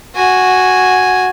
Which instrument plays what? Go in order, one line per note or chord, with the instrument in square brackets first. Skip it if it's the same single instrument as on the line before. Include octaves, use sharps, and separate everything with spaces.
[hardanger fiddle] F#4 G#5